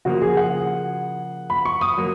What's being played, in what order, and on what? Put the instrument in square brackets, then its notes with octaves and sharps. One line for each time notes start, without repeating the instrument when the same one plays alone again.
[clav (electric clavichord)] C#3 F3 A#3 [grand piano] F#4
[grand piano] G#4
F#5
B5
C#6
D#6
[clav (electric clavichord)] F#3 A#3